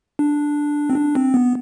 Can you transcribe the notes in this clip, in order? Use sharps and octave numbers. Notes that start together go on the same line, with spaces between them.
D4
C4
D4
C4
B3